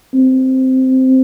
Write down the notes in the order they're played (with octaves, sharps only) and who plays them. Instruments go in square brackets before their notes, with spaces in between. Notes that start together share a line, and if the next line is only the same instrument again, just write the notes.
[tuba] C4